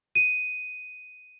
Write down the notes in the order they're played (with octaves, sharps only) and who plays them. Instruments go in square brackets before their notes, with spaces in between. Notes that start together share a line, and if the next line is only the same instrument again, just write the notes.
[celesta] D#7